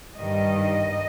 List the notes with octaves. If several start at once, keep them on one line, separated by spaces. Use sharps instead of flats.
G2 D#3 G3 D#5